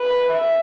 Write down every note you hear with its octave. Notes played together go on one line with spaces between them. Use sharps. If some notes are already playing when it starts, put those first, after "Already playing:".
Already playing: B4
E5